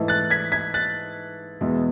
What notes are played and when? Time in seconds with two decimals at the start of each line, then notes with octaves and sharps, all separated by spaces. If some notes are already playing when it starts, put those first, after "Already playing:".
Already playing: G#2 E3 A3
0.08 F#6 A6
0.30 G#6 B6
0.52 G#6 B6
0.74 F#6 A6
1.61 E2 B2 G#3 B3